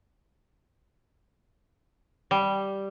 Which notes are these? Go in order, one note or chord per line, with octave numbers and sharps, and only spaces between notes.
G3